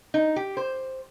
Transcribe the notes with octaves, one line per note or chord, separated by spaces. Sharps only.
D#4
G4
C5